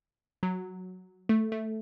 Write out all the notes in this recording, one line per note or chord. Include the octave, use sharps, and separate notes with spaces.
F#3
A3
A3